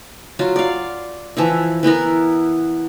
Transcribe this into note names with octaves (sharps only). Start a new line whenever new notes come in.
F#3 F4
D5 F5
E3 F3 E4
E3 B3 E4 A#4